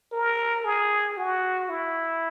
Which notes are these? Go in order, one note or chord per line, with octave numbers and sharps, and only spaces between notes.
A#4
G#4
F#4
E4